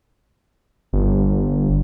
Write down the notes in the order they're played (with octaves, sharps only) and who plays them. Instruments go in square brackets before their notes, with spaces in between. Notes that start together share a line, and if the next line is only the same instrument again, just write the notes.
[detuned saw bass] G1